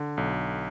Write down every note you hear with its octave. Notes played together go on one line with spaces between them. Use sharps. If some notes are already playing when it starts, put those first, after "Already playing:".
Already playing: D3
B1